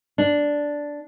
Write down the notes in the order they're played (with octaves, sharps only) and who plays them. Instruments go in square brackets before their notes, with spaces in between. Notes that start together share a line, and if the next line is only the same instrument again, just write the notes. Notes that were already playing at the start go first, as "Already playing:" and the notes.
[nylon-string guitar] D4